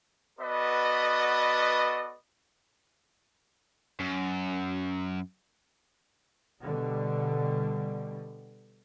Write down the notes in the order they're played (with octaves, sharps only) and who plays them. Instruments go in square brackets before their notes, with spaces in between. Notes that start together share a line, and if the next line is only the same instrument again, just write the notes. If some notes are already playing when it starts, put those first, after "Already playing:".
[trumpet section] B3 F#4 A4 B4 D5 D#5
[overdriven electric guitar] F#2
[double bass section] B2 D3 G3